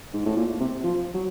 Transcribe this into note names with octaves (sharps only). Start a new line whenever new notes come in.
G#2
A2
A#2
C3
F3
F#3